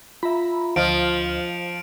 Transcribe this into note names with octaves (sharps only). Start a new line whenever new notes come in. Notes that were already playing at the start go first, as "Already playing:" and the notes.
F4 E5 A#5 B5
D2 F3 D#5 F6 D7